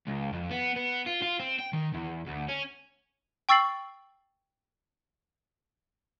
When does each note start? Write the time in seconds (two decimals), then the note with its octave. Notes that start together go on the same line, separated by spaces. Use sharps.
0.07 C#2
0.33 F2
0.51 B3
0.76 B3
1.06 F4
1.22 F4
1.40 C4
1.59 G5
1.73 D#3
1.94 E2
2.26 D2
2.48 C#4
3.49 G5 C#6 E6 A6 C7 F#7